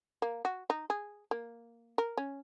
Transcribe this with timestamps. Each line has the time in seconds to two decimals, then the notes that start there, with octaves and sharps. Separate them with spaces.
0.22 A#3
0.45 F#4
0.70 D#4
0.90 G#4
1.31 A#3
1.98 A#4
2.17 C#4